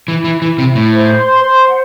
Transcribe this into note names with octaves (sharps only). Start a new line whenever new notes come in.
E3
E4
E3
E3 E4
C3
E4
A2
C5
C6
C5
F#5